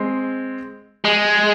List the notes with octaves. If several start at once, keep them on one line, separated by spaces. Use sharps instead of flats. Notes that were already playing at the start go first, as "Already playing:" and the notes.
Already playing: G#3 C4
G#3